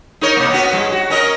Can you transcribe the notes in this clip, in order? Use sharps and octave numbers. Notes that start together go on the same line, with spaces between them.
D#4 A#4 C#5
C3 A#3
B3 C#4 F#4
G#2 G3
F#4
C#4 A#4 D#5